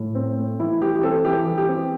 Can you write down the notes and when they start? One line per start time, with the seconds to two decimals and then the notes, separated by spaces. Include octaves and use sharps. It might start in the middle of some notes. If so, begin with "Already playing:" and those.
Already playing: A2
0.15 C4
0.37 A3
0.60 E3 E4
0.81 E3 G4
0.95 G4
1.03 C4 A4
1.25 E3 G4
1.47 E3
1.58 G4
1.68 C4